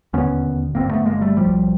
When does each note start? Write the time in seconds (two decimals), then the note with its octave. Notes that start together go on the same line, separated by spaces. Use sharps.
0.13 E1 D#2 D3 B3 C#4
0.75 G1 G2 D3 A#3 C4
0.91 A3 B3
1.06 G#3 A#3
1.21 G3 A3
1.37 B1 A2 F3 G3